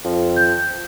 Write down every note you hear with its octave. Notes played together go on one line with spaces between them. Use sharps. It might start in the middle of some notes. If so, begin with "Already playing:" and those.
F2
G6